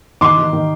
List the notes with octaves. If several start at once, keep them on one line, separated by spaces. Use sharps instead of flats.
D#3 C6 D6
D#3
D#3